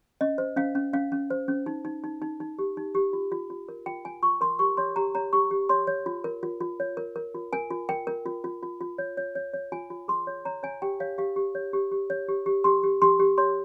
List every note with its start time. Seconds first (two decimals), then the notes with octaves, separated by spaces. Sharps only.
0.21 C#4 D#5
0.38 C5
0.57 C#4 F5
0.75 C#4
0.93 C#4 F5
1.12 C#4
1.30 C5
1.48 C#4
1.66 D#4
1.85 D#4
2.04 D#4
2.22 D#4
2.40 D#4
2.59 G4
2.77 D#4
2.95 G4
3.13 F4
3.32 F4
3.50 F4
3.69 A#4
3.86 F4 G5
4.05 F4 G#5
4.23 F4 C#6
4.41 A#4 C6
4.59 G4 C#6
4.77 C#5 C6
4.96 G4 A#5
5.15 C#5 A#5
5.33 G4 C#6
5.51 G4
5.69 C#5 C6
5.87 C#5
6.06 F4
6.24 A#4
6.43 F4
6.61 F4
6.80 C#5
6.97 A#4
7.16 A#4
7.35 F4
7.53 A#4 G#5
7.70 F4
7.89 A#4 G5
8.07 A#4
8.26 F4
8.44 F4
8.63 F4
8.81 F4
8.98 C#5
9.17 C#5
9.35 C#5
9.54 C#5
9.72 F4 G#5
9.90 F4
10.08 G#4 C6
10.27 C#5
10.45 C#5 A#5
10.63 C#5 G#5
10.82 G4 G5
11.00 C#5 F5
11.18 G4 F5
11.36 G4
11.55 C#5
11.73 G4
11.91 G4
12.10 C#5
12.28 G4
12.46 G4
12.64 G4 C6
12.83 G4
13.02 G4 C6
13.19 G4
13.38 C#5 C6